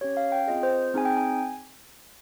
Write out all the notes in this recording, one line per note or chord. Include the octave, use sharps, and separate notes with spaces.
C#4 G4 C#5
F5
G5
C4 F4 G#4 D#5
C5
C4 D#4 G#4 G#5
G5
G#5